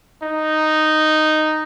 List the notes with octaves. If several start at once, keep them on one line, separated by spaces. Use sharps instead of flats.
D#4